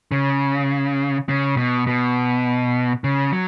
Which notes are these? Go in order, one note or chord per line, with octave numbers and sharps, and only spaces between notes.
C#3
C#3
B2
B2
C#3
F#3